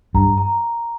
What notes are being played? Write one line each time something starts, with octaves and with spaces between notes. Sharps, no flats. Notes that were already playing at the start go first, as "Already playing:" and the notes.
G2 A#5
A#5